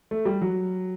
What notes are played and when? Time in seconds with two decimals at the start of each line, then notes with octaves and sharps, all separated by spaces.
0.11 A3
0.25 G3
0.41 F#3